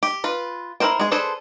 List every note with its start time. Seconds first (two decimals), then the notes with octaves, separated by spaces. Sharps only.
0.03 G4
0.24 F4 B4
0.80 E4 G#4 A#4 C5 G5
1.00 G#3 G#4
1.11 D4 G#4 A4 B4 C5